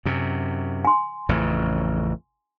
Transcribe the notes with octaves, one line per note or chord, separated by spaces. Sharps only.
F#2 C3
G#5 C6
A1 F2 C#3